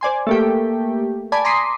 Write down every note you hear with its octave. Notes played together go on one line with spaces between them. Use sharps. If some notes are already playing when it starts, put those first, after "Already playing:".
C5 D5 G#5 C6
A3 A#3 G4
D5 G#5 A5 B5 D6
A#5 C6 D6 D#6 B6 C7